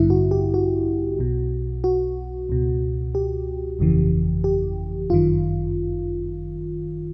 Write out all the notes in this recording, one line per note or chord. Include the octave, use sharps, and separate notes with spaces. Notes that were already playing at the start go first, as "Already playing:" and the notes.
Already playing: A1 G2 D3 E4
F#4
G4
F#4
B1 B2
F#4
C#2 B2
G4
G1 F2 C#3 E3
G4
G1 F#2 D#3 F4